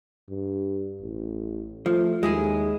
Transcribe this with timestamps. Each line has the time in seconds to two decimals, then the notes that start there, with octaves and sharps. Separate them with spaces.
0.29 G2
1.02 A1
1.86 F3 A3
2.23 D#2 G#3 E4 G#4